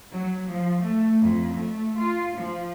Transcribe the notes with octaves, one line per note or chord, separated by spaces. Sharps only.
F#3
F3
A3
F2
A3
F4
F3